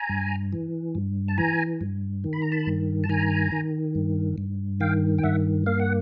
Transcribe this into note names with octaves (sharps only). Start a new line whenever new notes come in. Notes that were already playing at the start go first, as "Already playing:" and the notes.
Already playing: G#5 A#5
G2
E3
G2
A5
E3 G#5 A#5
G2
D#3
B5
A#5
A5 B5
G2
A5
D#3 G#5 A#5
D#3
G2
G2
D#3 F5 G5
G5
G2 E5 F#5
A#3 F5
F#5